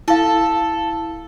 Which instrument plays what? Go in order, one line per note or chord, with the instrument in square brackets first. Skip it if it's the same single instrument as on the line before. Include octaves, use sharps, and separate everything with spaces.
[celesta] E4 F5 [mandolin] A4